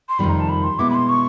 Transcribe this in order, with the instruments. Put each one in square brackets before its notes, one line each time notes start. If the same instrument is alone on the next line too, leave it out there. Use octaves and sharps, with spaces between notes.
[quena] C6
[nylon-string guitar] F2 C3 D#3 G3 [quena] B5
[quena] A#5
A5
B5
C6
[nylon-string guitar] B2 G#3 B3 E4 [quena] D6
[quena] B5
C6
C#6